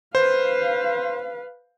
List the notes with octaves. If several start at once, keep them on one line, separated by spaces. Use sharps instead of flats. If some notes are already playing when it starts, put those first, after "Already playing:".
B4 C5 F5